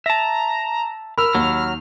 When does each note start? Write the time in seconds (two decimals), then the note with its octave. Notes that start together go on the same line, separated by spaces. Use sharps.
0.06 E5 A5 A#5
1.18 A#4 B5 E6 F6
1.35 D#2 F#3